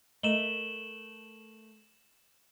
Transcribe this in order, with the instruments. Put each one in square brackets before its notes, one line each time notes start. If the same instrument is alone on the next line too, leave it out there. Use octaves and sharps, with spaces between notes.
[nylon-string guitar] A3 A#4 E5 [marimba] D#5 [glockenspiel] E7 F#7 G7